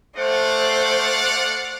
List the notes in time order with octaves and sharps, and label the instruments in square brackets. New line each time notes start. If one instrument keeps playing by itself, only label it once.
[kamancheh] A3 C5 [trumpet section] D5 F5 F#5